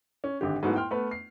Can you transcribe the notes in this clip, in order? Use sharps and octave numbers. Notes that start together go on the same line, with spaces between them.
C#4
G#1 D3 G4
G#2 F#3 A3 B3 E4
G5 C6 F6
A3 B3 B4
C7